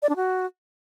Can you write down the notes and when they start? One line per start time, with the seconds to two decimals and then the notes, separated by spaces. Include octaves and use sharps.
0.02 D5
0.09 D4
0.16 F#4